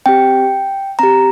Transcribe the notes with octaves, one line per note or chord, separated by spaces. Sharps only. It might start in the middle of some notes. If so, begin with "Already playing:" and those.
C4 G4 G5
C4 G4 A#5